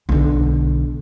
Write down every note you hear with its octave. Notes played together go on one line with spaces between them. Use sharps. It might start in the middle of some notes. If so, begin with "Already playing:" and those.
B1 D3